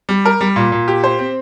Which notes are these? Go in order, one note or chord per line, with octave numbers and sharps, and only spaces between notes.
G3
A#4
G3
A#2
A#2
G4
C5
C4